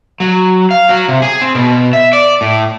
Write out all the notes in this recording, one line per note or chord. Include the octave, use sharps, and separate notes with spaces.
F#3
F5
F#3
C3
G#4
C4
B2
E5
D5
A2